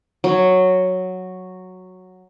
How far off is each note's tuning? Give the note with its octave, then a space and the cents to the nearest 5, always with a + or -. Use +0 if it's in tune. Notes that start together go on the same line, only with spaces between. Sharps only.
F#3 -5